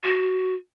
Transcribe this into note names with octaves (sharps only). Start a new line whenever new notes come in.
F#4